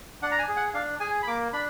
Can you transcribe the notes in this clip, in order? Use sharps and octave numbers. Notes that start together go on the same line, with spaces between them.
D4 F#5
A#5
G#5
G#4
F#5
D4 F5
G#4 G#5
B5
A#3 D6
D4 B5